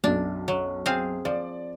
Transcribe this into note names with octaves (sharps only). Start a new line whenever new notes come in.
B1 F#2 D4
F#3
C4 G#4 F5
F3 D5